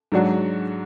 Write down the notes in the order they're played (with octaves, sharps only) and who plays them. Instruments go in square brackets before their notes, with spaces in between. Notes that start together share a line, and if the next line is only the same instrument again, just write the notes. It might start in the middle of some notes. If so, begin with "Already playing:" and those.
[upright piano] G#2 F#3 D4 F#4